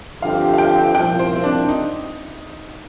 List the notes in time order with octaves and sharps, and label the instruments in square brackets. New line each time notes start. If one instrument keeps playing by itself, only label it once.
[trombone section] G2 D3 F3 C4 G4 [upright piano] F5
[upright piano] F5
G5
[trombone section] C2 A#2 F3 [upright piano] G5
[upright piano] C5
C4
D4
D#4